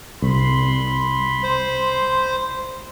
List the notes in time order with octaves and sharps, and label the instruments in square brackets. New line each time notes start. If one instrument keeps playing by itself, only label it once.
[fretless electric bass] C2 [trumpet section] B5 C6
[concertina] C5